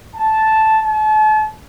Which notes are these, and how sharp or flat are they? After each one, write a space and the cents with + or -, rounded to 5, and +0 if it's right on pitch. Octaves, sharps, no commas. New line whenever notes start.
A5 -5
A5 -40